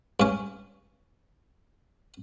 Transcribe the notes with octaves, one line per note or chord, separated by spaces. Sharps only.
G2 C#4